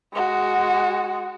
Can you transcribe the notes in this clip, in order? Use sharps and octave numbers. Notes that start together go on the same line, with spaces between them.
G#3 F#4